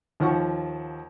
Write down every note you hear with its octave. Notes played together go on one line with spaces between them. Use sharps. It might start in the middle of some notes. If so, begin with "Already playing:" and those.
D#2 F3 F#5 C#6